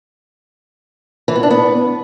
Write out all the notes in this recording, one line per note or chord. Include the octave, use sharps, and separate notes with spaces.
E3
B3
D4
B3